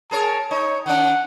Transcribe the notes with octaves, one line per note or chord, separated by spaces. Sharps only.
G#4 A#4 C#5 A5
D#4 C#5
D#3 C#4 F#5